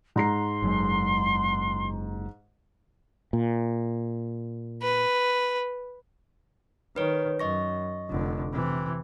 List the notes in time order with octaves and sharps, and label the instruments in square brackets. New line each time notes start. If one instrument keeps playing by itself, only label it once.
[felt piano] G#2 A#5 C7 [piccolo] C6
[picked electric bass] F#1 F#3 G#3
[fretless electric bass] A#2
[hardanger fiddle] B4
[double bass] D#3 [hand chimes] B4 C#5
[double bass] F#2 [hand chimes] D#5 C#6 A#6
[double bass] F1 D3
C3 E3